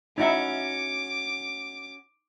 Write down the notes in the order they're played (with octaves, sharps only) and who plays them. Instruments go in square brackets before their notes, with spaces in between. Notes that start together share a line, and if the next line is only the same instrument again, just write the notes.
[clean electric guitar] C#4 F#4 [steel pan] D#4 E4 E5 [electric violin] D6